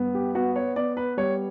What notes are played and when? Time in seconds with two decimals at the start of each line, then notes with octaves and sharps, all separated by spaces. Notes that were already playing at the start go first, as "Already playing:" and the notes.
Already playing: G2 B3
0.15 G4
0.35 B3 F#4
0.56 C#5
0.76 B3 D5
0.97 B4
1.17 G3 C#5